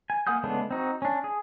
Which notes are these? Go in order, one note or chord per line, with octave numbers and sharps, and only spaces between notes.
G#5
A#3 F#5 G#5 D#6 G6
C#3 G#3 A3 B3 D4
C4 D#4 F#4
C#4 D4
G#4